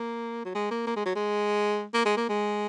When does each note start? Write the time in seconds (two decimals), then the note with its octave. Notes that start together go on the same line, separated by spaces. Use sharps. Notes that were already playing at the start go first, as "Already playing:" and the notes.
Already playing: A#3
0.45 F#3
0.55 G#3
0.71 A#3
0.87 A#3
0.96 G#3
1.06 F#3
1.16 G#3
1.94 A#3
2.06 G#3
2.17 A#3
2.29 G#3